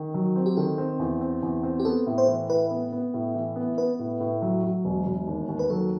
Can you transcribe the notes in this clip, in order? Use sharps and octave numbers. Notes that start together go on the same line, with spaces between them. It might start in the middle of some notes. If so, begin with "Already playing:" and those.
Already playing: D#3
F#3
C4
G4
D#3 A4
C4
E2
C4
E2
C4
G4
B3 A4
A2
C5
E3
A2 B4
B3
B3
A2
E3
B3
B3 B4
A2
A2
F#3
F#3
E1
E1
D#2
D#2
B4
F#3 A4